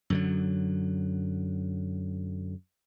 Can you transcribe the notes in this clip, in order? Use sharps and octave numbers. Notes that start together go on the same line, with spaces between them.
F#2 D3 F#3